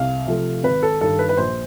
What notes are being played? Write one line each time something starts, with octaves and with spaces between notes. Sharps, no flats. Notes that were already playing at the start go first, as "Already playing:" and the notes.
Already playing: C2 F5
C3 F3 A3
G#1 B4
A4
G2 D#3 A4
B4
B4
A#1 C5